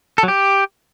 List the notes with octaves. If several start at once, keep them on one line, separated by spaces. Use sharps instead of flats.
A4
F#3
G4